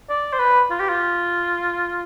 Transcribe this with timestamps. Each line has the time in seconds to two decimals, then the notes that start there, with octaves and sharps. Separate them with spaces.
0.09 D5
0.33 C5
0.39 B4
0.70 F4
0.80 G4
0.89 F4